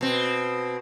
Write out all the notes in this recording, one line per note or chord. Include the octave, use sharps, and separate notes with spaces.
B2 C4